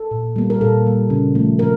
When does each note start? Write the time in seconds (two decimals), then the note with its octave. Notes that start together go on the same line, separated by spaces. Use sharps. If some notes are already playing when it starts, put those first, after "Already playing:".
Already playing: A4
0.11 A#2
0.36 G3 A#3
0.50 A#4
0.61 A#2 A4
0.86 G3 A#3
1.10 C#3
1.35 F3 A3
1.59 C#3 A#4